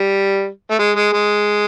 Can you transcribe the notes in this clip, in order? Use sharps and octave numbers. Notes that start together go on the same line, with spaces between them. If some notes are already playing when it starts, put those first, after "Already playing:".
Already playing: G3
A3
G#3
G#3
G#3